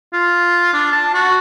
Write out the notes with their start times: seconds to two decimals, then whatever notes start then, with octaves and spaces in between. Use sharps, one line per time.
0.13 F4
0.73 D4
0.92 A5
1.14 F#4